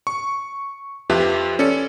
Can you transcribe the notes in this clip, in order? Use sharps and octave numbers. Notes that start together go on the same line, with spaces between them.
C#6
F2 F4 G4 B4 E5
C#4 A4 D5 C#7